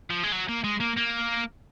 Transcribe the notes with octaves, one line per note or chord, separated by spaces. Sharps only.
F3
G#3
F#3
A#3
G#3
A#3
A#3